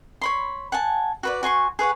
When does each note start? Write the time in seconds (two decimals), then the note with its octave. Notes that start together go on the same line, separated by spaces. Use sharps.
0.21 C#5 B5 C6
0.72 F#5 G#5 A5
1.23 F#4 B4 D5
1.43 F#4 G#5 C6 C#6
1.79 G#4 B4 C#5 F#5